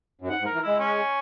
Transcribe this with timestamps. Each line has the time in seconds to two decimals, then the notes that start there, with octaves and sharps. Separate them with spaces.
0.21 F#2
0.28 G#2 F#5
0.41 G#2
0.46 A#4
0.54 E3
0.63 G#3 E4
0.79 C#4